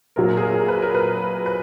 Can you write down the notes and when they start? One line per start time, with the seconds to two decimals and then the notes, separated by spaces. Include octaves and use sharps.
0.16 A#1 A#2 F#3 A#4
0.37 G#4
0.43 A#4
0.68 B4
0.82 A#4
0.95 B4
1.46 B4